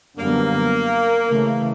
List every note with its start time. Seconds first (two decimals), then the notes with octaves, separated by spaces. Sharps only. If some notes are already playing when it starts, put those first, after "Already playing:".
0.18 F#2 D3 G3 A#3 B3
1.28 C#3 E3 A3